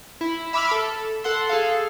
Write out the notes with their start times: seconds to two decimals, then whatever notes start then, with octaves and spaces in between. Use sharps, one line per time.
0.21 E4
0.53 E5 B5 D6 E6 F6
0.71 A4
1.24 A4 F#5 C6
1.49 G#4 A4 F5